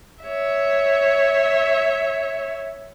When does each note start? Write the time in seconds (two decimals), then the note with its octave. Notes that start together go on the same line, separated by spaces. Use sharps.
0.23 C#5 E5